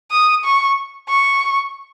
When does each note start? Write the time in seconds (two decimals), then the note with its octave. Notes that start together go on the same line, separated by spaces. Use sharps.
0.11 D#6
0.44 C#6
1.09 C#6